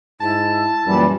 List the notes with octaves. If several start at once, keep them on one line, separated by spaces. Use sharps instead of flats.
G#2 E4 A5
F#2 A#2 E3 G3